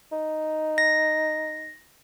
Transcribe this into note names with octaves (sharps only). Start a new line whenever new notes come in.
D#4
A#6